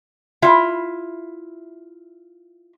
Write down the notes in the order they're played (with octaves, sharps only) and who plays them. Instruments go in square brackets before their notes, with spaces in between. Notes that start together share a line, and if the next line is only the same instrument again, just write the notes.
[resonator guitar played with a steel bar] E4 F4 E5